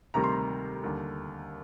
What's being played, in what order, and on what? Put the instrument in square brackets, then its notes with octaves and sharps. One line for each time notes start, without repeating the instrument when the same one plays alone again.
[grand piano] D2 C3 D#3 G3 A#5
C6
A#5
D#2 D3 G3